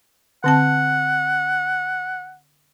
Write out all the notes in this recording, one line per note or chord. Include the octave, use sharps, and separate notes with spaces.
D3 C4 F#5 A5